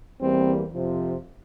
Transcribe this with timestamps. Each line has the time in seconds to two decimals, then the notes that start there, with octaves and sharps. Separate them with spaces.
0.21 E2 E3 G3 A#3 C4
0.74 F2 C3 F3